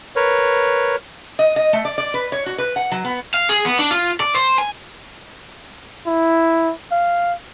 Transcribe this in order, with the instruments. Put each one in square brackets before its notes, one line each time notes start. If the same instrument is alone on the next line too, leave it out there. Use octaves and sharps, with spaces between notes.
[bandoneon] A#4 B4 C#5
[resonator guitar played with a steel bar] D#5
D#5
A3
D5
D5
B4
C#5
F#4
B4
F#5
F#3
B3
[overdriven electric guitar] F5
G#4
B3
D4
F4
D5
C5
G#5
[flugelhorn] E4
F5